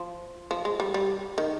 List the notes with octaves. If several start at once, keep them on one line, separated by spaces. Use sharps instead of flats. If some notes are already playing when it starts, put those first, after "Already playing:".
Already playing: F3
F3
G#3
G3
G3
D#3